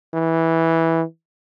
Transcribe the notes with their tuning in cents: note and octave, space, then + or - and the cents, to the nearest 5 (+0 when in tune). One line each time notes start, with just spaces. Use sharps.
E3 -10